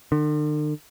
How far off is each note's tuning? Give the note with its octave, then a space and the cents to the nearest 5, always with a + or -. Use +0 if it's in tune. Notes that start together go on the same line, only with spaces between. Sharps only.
D3 +45